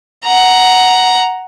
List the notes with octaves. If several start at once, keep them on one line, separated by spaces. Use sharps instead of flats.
F#5 A#5